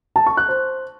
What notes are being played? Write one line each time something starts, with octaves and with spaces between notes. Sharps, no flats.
A5
C#6
F#6
C5